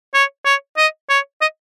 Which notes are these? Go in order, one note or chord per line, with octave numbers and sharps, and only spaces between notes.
C#5
C#5
D#5
C#5
D#5